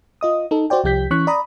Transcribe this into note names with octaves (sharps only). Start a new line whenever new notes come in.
F4 D#5 D#6
D#4 A4
F#4 C5 D5 G5
C2 F3 G4 G6 B6
E3 C#4 C#6 F#6 B6
D5 A#5 B5 D#6